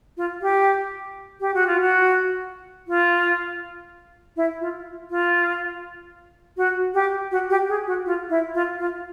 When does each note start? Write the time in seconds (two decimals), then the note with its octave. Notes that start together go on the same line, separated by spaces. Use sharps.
0.17 F4
0.42 G4
1.40 G4
1.54 F#4
1.67 F4
1.81 F#4
2.88 F4
4.37 E4
4.61 F4
5.10 F4
6.57 F#4
6.94 G4
7.31 F#4
7.50 G4
7.69 G#4
7.87 F#4
8.06 F4
8.30 E4
8.54 F4
8.79 F4